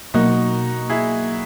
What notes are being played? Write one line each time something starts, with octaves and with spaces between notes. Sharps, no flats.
B2 F#3 A#3 D#4 F#4
E4 G#4